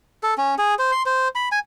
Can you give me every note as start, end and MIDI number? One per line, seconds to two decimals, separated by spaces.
0.23 0.34 69
0.38 0.55 61
0.58 0.75 68
0.79 0.91 72
0.92 1.03 84
1.06 1.28 72
1.35 1.49 83
1.52 1.59 80